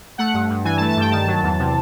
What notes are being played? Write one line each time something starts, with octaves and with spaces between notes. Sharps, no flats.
A3 F#5
G2
G2
E3 G#5
A5
A3
A5
G2 G5
D#3 A5
F#3
E2
C3